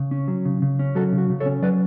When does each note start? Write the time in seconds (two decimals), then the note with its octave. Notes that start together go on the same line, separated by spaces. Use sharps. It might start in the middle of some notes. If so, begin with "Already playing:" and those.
Already playing: C#3
0.11 C#4
0.28 F#3
0.45 C#3
0.62 C#3
0.79 C#4
0.95 F#3 F#4 A4
1.12 C#3
1.18 F#4
1.30 C#3
1.40 A4 C#5
1.46 C#4
1.62 F#3 B4 D5